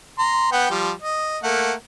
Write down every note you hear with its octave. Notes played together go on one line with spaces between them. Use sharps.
A#5 C6
B3 F#5 G5
F3 G3
D#5
A3 A#3 F#5